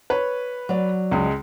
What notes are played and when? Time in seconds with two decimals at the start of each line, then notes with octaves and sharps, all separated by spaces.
0.10 B4 C#5
0.69 F#3 D5
1.11 C#2 G#3